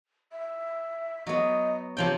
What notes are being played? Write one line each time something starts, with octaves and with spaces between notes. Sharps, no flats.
E5
F#3 B3 D#5
C3 F3 C#5 G5